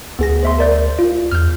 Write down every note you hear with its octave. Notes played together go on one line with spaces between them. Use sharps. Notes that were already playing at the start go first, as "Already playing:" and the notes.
D2 B3 G#4 A#6
C5 E5 C6
A#4 D5 G6
F4
E2 F6 G6